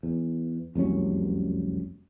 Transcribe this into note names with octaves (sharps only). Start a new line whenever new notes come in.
E2
F1 C2 F#2 C#4